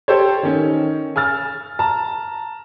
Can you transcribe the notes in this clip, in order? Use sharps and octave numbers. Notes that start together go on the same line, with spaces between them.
G4 A4 C5 C#5
D#3 C#4
G#5 E6 F6 A6
A5 A#5